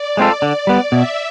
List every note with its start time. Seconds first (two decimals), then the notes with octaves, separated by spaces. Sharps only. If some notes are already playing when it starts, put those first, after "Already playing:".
Already playing: D5
0.17 G#3 C4 F4 A4
0.42 D3
0.67 G3 B3
0.91 B2 E5